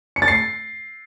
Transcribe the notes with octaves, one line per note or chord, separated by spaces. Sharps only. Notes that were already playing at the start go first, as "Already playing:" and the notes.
C#7
A6
C7